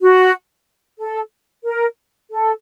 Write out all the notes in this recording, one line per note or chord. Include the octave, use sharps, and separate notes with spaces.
F#4
A4
A#4
A4